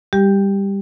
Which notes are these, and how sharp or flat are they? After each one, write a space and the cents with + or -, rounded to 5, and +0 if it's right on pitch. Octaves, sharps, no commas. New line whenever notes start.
G3 +20 G4 +0